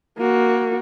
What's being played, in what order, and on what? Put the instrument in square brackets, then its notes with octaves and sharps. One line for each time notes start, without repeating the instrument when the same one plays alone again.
[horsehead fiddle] A#3 F#4